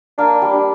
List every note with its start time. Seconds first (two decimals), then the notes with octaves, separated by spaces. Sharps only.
0.18 A#3 D4
0.42 G3
0.53 D4